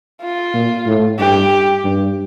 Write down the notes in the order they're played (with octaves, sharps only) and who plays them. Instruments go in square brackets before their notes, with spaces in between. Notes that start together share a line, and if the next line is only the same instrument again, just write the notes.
[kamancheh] F4
[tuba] A#2
A2
[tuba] G2 [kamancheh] G4
[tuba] G2